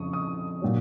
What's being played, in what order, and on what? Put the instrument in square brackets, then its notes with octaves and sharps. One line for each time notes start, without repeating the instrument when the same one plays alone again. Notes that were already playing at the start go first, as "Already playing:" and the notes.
Already playing: [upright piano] F2 C#3 F3 C#6 D#6
D#6
A#2 F#3